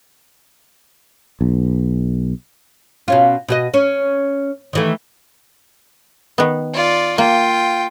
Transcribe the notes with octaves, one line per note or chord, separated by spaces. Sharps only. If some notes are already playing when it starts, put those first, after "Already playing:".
B1
B2 C#4 F4
B2 F#4 D#5
C#4
D#3 E3 A3
D#3 B3
F4 D5
A#3 F4 G5